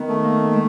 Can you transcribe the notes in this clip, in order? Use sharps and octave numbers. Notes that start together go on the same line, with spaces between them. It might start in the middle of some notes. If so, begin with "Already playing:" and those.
Already playing: D#3 B3
A3
A#3
G#3